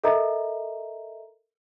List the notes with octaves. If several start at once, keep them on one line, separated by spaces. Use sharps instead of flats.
A4 A#4 D#5 E5 A#5